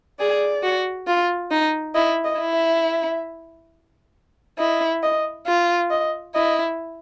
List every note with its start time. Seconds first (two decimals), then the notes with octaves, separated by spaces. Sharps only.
0.19 G#4 D5
0.63 F#4
1.08 F4
1.51 D#4
1.94 E4 D#5
2.24 D#5
2.39 E4
2.54 E5
4.59 E4 D#5
5.03 D#5
5.46 F4
5.90 D#5
6.35 E4 D#5